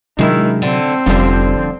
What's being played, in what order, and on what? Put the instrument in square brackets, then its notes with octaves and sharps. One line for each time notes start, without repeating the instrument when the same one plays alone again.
[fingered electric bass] C3 F#3 D4 [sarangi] D#3 [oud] G#3 E4
[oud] D3 [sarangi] C4
[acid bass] F1 [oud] D3 F3 [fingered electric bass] G3 C#4